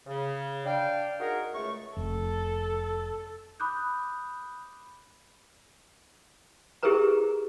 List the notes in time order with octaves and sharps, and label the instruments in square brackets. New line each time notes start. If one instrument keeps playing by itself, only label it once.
[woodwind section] C#3
D4 F5 G5
D#4 F#4 G#4 A#4
C#2 A3 C#6
[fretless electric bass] F1 [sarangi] A4
[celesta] B5 D6 D#6 F#6 G6
[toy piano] E4 G4 G#4 A#4 B4 A#5